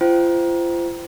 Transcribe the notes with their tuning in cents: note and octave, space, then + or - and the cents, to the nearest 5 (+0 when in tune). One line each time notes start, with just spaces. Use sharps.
F4 -35 C5 -20 G5 -25